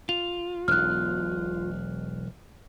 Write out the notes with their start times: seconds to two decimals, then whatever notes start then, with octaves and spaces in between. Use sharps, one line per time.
0.09 F4 F7
0.68 E1 B1 F6 F#6